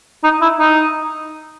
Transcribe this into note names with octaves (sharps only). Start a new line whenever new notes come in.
D#4
E4
D#4